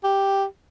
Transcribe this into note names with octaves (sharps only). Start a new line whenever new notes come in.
G4